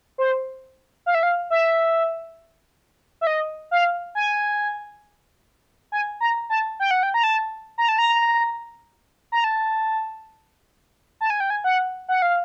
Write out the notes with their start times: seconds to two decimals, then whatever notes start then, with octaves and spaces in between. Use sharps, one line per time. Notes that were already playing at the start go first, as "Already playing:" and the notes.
0.18 C5
1.06 F5
1.15 E5
1.23 F5
1.50 E5
3.21 E5
3.27 D#5
3.71 F5
4.15 G#5
5.92 G#5
6.21 A#5
6.50 A5
6.80 G5
6.91 F#5
7.03 G5
7.14 A#5
7.24 A5
7.78 A#5
7.89 A5
7.98 A#5
9.32 A#5
9.44 A5
11.21 A5
11.30 G#5
11.40 G5
11.50 G#5
11.64 F#5
12.08 F#5
12.22 F5